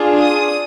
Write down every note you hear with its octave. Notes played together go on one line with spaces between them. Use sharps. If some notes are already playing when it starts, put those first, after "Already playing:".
Already playing: D4 F4 G#4
D#6